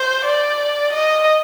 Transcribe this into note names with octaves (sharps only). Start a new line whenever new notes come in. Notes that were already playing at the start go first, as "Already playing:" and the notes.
Already playing: C5
D5
D#5